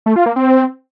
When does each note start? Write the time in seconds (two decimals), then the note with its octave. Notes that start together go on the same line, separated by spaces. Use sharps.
0.06 A3
0.16 F4
0.26 A#3
0.36 C4